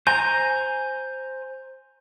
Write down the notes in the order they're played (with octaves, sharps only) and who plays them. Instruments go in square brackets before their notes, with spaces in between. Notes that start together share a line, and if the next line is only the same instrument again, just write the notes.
[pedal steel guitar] C5 G#5 A#5 [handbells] G6